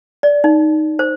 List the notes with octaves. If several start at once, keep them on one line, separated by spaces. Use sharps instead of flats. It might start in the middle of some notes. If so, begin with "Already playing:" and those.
D5
D#4
C5